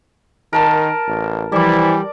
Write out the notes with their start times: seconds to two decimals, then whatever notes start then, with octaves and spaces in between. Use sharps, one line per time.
0.53 D#3 A#4 A5
1.07 A1
1.52 E3 F3 G3 E4 D5 D6